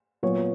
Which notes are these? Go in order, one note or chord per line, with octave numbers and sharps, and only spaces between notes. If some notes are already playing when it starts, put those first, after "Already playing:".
A#2 F#3 B3 C#5